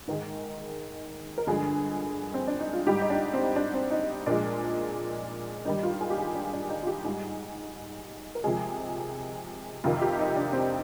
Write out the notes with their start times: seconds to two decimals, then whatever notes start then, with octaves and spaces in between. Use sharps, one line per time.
0.07 G#2 D#3 G#3 A#4
1.38 A#4
1.47 G2 D3 F3 G#3 G#4
2.34 C4
2.48 D4
2.60 D#4
2.73 F4
2.87 G#2 G3 G4
3.02 D#4
3.10 D4
3.34 C4
3.56 D4
3.74 C4
3.91 D#4
4.26 A#2 F3 G#3 D4
5.65 G2 D#3 G3 D#4
5.83 F4
6.01 G#4
6.10 G4
6.18 G#4
6.35 D4
6.53 D4
6.70 D#4
6.83 F4
6.87 G4
7.05 G#2 G3 G#4
8.35 A#4
8.44 C3 F3 G#3 G#4
9.84 F2 C3 D#3 F4
10.01 G4
10.19 D#4
10.36 D4
10.53 C4